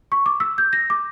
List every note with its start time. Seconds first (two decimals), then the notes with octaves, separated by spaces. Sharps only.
0.12 C#6
0.26 D6
0.40 E6
0.58 G6
0.73 A#6
0.90 D6